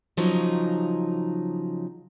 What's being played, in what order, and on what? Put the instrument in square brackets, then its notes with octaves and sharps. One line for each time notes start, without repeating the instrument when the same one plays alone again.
[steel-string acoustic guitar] C#3 F3 F#3 D#4